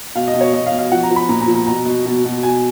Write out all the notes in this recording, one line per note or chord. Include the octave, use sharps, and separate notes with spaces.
B2 F5
D#5
B2
C#5
B2 D#5
F5
B2
F5
F3 F#5
A#5
F3
B5
A#2 A#5
A#5
F3
A#5
B2 A#5
B2
B2
B2
B2 G#5